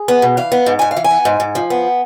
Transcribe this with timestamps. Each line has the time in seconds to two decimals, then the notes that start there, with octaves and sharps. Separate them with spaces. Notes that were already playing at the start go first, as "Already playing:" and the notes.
Already playing: G#4
0.08 B3
0.22 B2
0.37 E3 F5
0.52 B3
0.66 G#2
0.79 G#2 G#5
0.91 F5
0.97 E3
1.04 G#5
1.11 B3
1.25 G#2
1.40 G#2
1.55 F3
1.70 B3